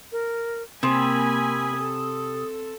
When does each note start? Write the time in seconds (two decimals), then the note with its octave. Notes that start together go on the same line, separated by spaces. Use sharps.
0.12 A#4
0.83 C3 A#3 C4 G#5 B5 D#6
1.76 A4